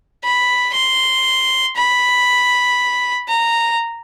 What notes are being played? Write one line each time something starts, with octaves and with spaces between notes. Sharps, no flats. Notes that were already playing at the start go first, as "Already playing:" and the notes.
B5
C6
B5
A#5